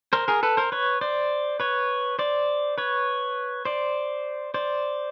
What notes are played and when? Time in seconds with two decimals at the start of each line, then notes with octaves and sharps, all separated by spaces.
0.13 A#4 C5
0.28 G#4 A#4
0.43 A4 B4
0.57 A#4 C5
0.72 B4 C#5
1.01 C5 D5
1.60 B4 C#5
2.19 C5 D5
2.78 B4 C#5
3.65 C5 D5
4.54 C5 D5